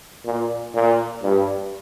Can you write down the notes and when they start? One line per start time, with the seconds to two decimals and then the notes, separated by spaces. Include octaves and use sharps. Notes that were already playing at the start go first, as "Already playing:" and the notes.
0.25 A#2
0.75 A#2
1.23 G2